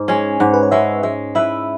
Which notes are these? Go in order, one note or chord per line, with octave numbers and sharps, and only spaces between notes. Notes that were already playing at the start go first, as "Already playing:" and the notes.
Already playing: G#2
G#3 C#4 G#5
G#2 F#5
B4
C#5
G#3 C#4 E5
G#3 E5
E4 B4 E5